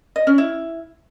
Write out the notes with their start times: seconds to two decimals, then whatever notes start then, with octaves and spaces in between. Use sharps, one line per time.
0.16 D#5
0.27 C#4
0.38 E4